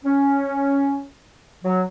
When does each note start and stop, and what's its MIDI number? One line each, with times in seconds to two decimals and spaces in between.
0.05 1.06 61
1.64 1.81 54